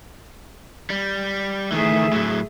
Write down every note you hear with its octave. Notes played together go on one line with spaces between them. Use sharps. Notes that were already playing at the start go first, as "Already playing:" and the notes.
G3
D#3 E3 A3 G#4 E5
A2 F#3